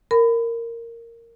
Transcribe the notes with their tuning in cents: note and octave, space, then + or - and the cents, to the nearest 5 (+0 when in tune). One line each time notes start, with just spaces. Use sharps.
A#4 -10 B5 +25